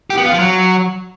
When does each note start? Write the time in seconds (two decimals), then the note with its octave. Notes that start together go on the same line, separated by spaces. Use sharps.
0.10 G4
0.18 B3
0.25 F4
0.32 F3
0.39 F#3